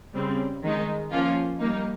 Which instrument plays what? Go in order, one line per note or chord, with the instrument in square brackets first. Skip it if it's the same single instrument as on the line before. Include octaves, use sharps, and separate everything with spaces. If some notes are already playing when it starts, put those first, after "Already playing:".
[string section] C#3 G3 C4
D#3 G#3 D#4
F3 A#3 C#4 F4
G3 A#3 D#4